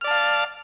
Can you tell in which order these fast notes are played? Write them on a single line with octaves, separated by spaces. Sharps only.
F6 D5 A5 F5